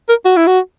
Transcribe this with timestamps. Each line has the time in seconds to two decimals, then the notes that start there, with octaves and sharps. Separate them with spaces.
0.09 A#4
0.25 F#4
0.37 E4
0.47 F#4